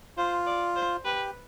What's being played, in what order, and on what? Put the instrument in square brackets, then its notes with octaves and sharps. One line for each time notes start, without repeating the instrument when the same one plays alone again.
[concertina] F4 [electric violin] C5
[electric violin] D5
C5
[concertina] G4 [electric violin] B4